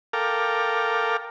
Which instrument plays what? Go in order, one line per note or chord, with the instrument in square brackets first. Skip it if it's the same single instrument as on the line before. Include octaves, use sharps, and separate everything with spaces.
[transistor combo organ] A4 A#4 F5 G5 D6 F6